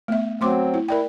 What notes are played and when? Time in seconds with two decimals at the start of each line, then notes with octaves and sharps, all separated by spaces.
0.08 A3 B3 E5
0.41 F#3 A3 C4 C6 D6
0.74 E4
0.88 E4 A#4 D5 G5